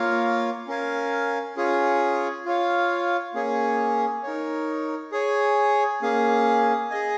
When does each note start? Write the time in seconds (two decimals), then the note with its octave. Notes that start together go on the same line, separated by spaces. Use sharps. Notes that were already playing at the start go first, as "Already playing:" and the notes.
Already playing: A#3 F4 A#4 C#5 F5
0.68 C#4 A#4 F5 G#5
1.56 C#4 F4 G#4 C#5 G#5
2.45 F4 C#5 F5
3.34 A#3 C#4 G#4 C#5 G#5
4.23 D#4 A#4 C#5
5.12 G#4 C#5 G#5
6.02 A#3 C#4 G#4 F5 G#5
6.90 G#4 D#5 G#5